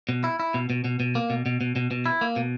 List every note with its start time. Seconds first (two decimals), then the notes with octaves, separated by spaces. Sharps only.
0.09 B2
0.24 E4
0.40 E4
0.54 B2
0.70 B2
0.84 B2
1.00 B2
1.15 A#3
1.30 B2
1.46 B2
1.61 B2
1.76 B2
1.91 B2
2.06 E4
2.21 A#3
2.36 B2